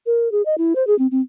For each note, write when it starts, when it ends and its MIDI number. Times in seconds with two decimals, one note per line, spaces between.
0.06 0.31 70
0.32 0.42 68
0.46 0.58 75
0.58 0.73 64
0.76 0.86 72
0.87 0.97 68
0.99 1.07 60
1.11 1.21 60